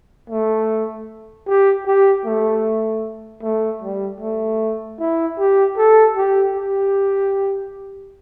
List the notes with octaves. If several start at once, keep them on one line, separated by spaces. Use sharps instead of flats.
A3
G4
G4
A3
A3
G3
A3
E4
G4
A4
G4
G4